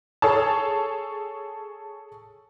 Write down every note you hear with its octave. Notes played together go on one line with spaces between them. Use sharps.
G#4 A4 C#5 A5